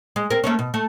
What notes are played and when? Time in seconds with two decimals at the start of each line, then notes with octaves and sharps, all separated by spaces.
0.16 G#3
0.30 C4 A#4
0.44 A3 A#3 C#4
0.59 B2
0.74 A3